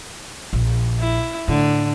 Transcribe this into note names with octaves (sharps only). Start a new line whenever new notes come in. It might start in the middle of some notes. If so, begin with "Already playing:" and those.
A#1
E4
A2 D3